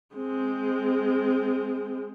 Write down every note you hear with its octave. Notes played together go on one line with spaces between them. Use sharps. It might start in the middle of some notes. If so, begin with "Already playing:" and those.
G#3 C4